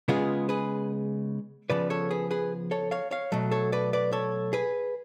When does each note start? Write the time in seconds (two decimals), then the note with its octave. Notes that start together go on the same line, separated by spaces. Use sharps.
0.08 C#3 G#3 B3 F4 G#4
0.49 G#4 B4
1.70 C#3 F3 B3 B4 D5
1.90 A4 C#5
2.11 G#4 B4
2.31 G#4 B4
2.71 A4 C#5
2.91 C#5 F5
3.11 C#5 F5
3.32 B2 F#3 A3
3.51 A4 C#5
3.72 B4 D5
3.93 B4 D5
4.13 A4 C#5
4.53 G#4 B4